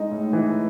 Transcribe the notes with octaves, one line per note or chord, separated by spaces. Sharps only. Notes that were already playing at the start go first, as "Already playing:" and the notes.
Already playing: G#3 D#4
A2
E3